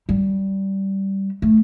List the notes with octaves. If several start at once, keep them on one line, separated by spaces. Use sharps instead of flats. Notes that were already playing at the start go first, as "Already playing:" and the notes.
G3
A3